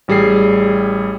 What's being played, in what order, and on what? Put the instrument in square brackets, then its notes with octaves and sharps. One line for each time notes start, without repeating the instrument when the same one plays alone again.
[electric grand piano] A1 G3 G#4 C7